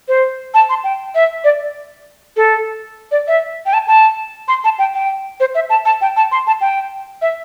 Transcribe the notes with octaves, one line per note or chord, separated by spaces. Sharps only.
C5
A5
C6
G5
E5
D5
A4
D5
E5
G5
A5
A5
C6
A5
G5
G5
C5
E5
A5
A5
G5
A5
C6
A5
G5
E5